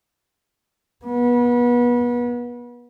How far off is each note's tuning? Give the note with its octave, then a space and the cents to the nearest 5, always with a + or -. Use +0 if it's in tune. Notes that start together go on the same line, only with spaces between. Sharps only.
B3 -30